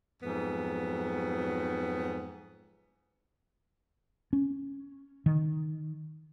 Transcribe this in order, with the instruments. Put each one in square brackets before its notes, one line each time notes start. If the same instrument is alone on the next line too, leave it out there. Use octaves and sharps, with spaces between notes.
[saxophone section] F2 G#2 F#3 B3
[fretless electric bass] C#4
D#3